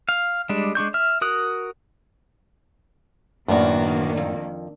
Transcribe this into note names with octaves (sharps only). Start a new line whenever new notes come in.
F5
G3 G#3 D4
G#3 D4 C#6 G6
E5 F6
F#4 A#4 D#6 F#6
F#2 A2 D#3 A#3 B3 D4 F#4
F2